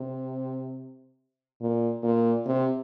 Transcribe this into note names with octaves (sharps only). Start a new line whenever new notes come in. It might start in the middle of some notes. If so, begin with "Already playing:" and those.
Already playing: C3
A#2
A#2
C3